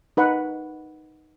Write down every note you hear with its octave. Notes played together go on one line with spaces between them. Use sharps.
D#4 B4 F#5